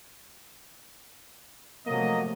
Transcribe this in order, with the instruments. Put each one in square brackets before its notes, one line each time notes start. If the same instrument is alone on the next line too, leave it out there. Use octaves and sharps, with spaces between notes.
[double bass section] C3 F3 A3 [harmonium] F#3 [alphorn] A#3 [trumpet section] D#5